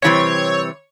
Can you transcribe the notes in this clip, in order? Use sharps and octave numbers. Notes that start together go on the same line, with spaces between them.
C3 E3 G3 C4 C#5